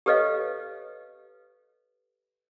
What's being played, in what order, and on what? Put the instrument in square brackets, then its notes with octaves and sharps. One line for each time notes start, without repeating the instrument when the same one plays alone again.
[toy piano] G4 A4 B4 C#5 D#5 F5